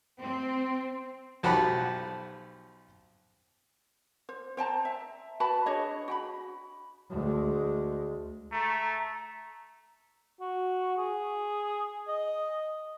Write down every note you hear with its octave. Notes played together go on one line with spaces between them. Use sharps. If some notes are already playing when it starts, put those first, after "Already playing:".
C4
B1 F3 F#4 G4 F#5 B5
C5
C5 G5 A5 A#5
E5
F#4 B4 A5 B5
D4 G#4 C#5 D#5
F#4 G5 B5
D2 G#3
A3 A#5
F#4
G#4
D#5